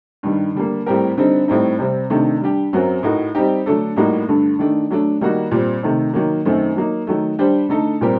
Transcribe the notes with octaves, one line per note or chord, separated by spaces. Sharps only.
G2 D#3 G3
D3 G3 A#3
A2 G3 C4 G4 A#4
D3 G3 C4 D#4
A2 G3 C4 D#4
C3 G3 C4
C3 D#3 A3 D4
G3 D4 G4
F#2 F#3 C4 F#4 A#4
A2 A3 D#4 F#4 A#4
G3 C4 D#4 G4
D3 F#3 A3 D4 A4
A2 G3 A#3 D#4 F#4
G2 D3 A3
D#3 A3 D4
F#3 A3 D4
D#3 G3 A#3 D#4 F#4
A#2 G3 C4
C3 D#3 A3
D#3 F#3 A#3
F#2 D#3 A3 C4
F#3 A#3 D#4
D#3 F#3 A3
G3 D4 G4 C5
D3 A3 D#4 A4
A#2 G3 C4 G4 A#4